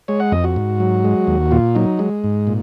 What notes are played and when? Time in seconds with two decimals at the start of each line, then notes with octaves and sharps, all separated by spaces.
0.08 G#3 C#5
0.20 F#5
0.32 F2 D#5
0.44 F#4
0.56 G#2
0.80 F#3
1.04 G#3
1.27 D#2
1.51 A#2 F4
1.75 F#3 D#4
1.99 G#3
2.24 G#2
2.47 A#2